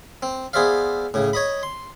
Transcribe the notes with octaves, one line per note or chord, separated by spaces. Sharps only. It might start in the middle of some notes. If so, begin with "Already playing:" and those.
C4
B3 G#4 C5 D5 E5 F5
A2 C#3
C#5 D#5 B5
C6